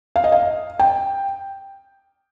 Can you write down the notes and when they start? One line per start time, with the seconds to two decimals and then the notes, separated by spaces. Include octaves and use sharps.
0.16 F5
0.24 D#5
0.32 F5
0.79 G5